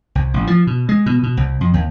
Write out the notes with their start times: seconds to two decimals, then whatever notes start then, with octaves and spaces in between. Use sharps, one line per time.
0.15 C2
0.34 A1
0.47 F3
0.67 B2
0.89 G#3
1.06 B2
1.23 B2
1.37 C2
1.61 F2
1.74 D#2